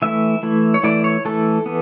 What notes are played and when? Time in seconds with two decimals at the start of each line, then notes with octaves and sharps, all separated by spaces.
0.02 E3 A3 E4 E5
0.43 E3 A3 E4
0.74 C#5
0.83 E3 A3 E4 D5
1.04 C#5
1.25 E3 A3 E4 A4
1.66 E3 B3